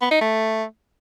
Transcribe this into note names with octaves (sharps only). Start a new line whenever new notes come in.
B3
D#4
A3